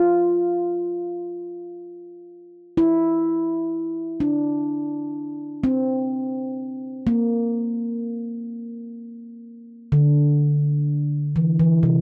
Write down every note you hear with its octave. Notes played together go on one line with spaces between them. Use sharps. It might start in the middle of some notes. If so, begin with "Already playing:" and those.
Already playing: F4
E4
D4
C4
A#3
D3
E3
E3
C3